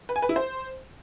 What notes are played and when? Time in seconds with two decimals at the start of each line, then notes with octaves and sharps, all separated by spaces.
0.09 B4
0.16 G#5
0.22 B4
0.29 E4
0.36 C5